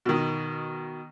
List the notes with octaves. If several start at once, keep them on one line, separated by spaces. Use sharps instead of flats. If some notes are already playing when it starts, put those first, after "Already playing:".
B2 D#3